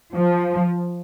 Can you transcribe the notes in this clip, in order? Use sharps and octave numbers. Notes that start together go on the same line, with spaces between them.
F3